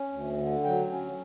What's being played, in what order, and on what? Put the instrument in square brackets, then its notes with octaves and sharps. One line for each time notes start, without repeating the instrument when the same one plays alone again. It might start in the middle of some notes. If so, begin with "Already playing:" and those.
Already playing: [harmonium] C#4
D2
D3
F#3 G5
C#4